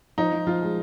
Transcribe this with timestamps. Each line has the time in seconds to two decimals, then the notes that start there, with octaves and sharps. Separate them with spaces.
0.18 F3 D#4
0.32 F3
0.47 F3 F4
0.62 G#3